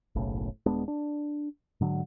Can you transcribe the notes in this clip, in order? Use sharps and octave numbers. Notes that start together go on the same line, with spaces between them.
F#1 B1 A2 C#3
D#1 G#3 B3 D4
D4
G#2 D3 F#3